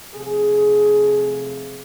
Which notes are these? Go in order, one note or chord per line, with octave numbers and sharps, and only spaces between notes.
C3 F3 A3 G#4